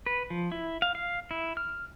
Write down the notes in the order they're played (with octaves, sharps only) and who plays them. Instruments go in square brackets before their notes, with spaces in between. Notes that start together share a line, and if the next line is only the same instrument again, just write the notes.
[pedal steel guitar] B4
F3
E4
F5
F5
E4
F6